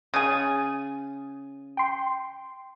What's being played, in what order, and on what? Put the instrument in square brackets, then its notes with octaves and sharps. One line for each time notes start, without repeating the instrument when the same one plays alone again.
[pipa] C#3 G#4 [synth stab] A6 D#7
[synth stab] G5 C6